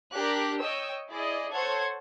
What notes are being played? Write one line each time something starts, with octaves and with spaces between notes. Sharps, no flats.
D4 G4 A#4 F#6
C#5 D#5 G5 E6
E4 G#4 D5 D#5
A4 C5 C#5 F#5 G#6